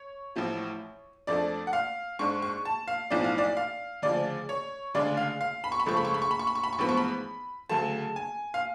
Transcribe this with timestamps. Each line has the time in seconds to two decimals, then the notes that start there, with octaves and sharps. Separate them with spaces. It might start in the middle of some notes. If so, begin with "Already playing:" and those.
Already playing: C#5
0.36 A1 A2 F3
1.27 F2 F3 A3 D4 D5
1.67 F#5
1.73 F5
2.19 G#2 G#3 D4 C#6
2.42 C#6
2.65 A5
2.88 F5
3.10 B1 A2 F3 D5
3.24 F5
3.38 D5
3.57 F5
4.02 D2 C#3 F3 D5
4.49 C#5
4.94 D2 C#3 G#3 D4 D5
5.17 F5
5.41 F5
5.64 B5
5.72 C#6
5.80 B5
5.86 C#2 C#3 F3 A3 C#6
5.97 B5
6.05 C#6
6.14 B5
6.22 C#6
6.31 B5
6.39 C#6
6.47 B5
6.55 C#6
6.64 B5
6.73 C#6
6.79 A1 G#2 F3 B3 B5
6.89 C#6
6.97 B5
7.70 D2 C#3 F#3 A3 A5
8.16 G#5
8.54 F5